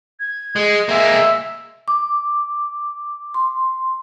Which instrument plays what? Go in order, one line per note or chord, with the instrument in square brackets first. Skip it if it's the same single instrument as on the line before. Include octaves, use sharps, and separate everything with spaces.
[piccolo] G#6
[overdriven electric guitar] G#3
[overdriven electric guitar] G#3 A#3 [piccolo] E5
[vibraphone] D6
C6